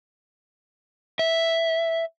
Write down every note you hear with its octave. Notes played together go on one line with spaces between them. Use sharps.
E5